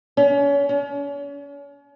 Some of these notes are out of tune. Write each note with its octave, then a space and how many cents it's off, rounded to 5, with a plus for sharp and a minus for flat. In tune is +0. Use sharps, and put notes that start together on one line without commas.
C#4 +30
C#4 +40